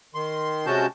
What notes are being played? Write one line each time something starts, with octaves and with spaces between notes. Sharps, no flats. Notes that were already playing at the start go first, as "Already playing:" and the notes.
D#3 C6
C3 G#3 C#4 F#4 A5 G6